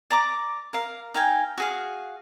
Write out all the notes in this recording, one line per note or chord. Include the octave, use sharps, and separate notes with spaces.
D5 A#5 D6
A#4 F5
D#4 F5 G5 G#5
F#4 G#4 F5